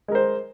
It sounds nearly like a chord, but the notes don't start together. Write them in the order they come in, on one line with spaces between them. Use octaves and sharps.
G#3 A#4 C5